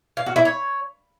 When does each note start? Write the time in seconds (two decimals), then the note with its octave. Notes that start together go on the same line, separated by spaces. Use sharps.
0.17 F5
0.26 F#4
0.36 E4
0.45 C#5